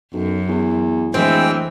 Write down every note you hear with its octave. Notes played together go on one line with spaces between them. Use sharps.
B1 F#2
E2
D1 E3 G#3 C4 G5